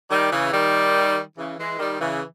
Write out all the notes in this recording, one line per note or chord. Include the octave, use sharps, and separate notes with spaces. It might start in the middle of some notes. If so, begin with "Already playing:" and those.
D#3 G3
C#3 E3
D#3 G3
C#3 E3
E3 G#3
D#3 G3
C#3 E3